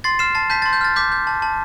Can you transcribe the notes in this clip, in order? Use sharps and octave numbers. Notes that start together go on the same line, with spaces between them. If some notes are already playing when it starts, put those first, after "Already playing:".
C6 A6 C7
F6 C7 E7
A5 A6 C7
A5 G6 B6
A6
C6
G6
F6 A6
D6 G6 B6
G6
A5
A5